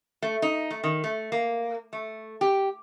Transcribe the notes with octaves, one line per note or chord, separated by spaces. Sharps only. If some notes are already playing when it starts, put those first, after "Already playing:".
A3
D#4
A3
D#3
A3
A#3
A3
G4